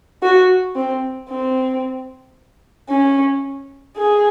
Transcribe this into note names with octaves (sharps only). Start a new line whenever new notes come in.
F#4
C4
C4
C#4
G#4